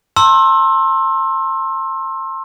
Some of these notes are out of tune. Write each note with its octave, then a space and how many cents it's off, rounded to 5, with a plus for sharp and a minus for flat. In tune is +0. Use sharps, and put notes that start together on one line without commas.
A5 +45 C6 +30 E6 +0